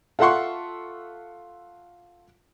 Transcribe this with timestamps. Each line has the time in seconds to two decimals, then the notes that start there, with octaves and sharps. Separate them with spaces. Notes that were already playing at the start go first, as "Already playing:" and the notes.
0.19 F4 A4 E5 F#5 C6 C#6